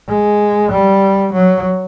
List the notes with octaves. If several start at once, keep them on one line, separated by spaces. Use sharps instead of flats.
G#3
G3
F#3